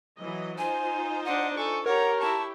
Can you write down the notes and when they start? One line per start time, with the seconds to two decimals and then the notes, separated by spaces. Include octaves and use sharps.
0.17 E3 F#3 D#5
0.58 D#4 F4 C5 G#5
1.25 D4 D#5 F#5
1.57 A4 G#5 C#6
1.86 G4 A#4 C#5 F#5 A#5
2.20 E4 A5 C#6